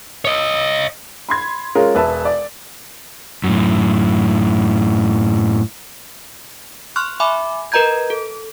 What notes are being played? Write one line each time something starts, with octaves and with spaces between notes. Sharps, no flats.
C#5 D#5
B5 C6 G#6
G#3 C#4 F4 A#4
E1 B4 E5 A5
D5
F#2 A2
C6 C#6 F6 F#6
E5 G#5 B5 D6
A#4 B4 D#5 A#5 G6 G#6
A4